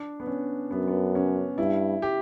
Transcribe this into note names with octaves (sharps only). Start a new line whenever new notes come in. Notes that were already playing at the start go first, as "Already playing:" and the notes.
Already playing: D4
B3
C#4
F#2 B3
B3
C#4
G2 E4
G4